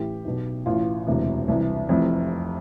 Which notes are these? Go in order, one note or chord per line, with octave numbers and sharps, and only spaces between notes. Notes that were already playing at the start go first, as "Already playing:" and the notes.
Already playing: A1 A2 E3 G4
B1 B2
A1 A2 E3 F4
E1 D2 C3 E3
C2 C3 E3
F1 F2 C3 E3